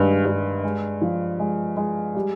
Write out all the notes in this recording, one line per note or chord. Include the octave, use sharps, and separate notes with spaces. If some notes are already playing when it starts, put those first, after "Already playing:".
Already playing: G2 D#3 G#3
G2
G#3
F3
G#3
G#3
G3